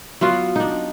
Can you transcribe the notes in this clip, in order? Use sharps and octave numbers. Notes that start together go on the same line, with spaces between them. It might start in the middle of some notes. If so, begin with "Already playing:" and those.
F#3 B3 F4
D4 D#4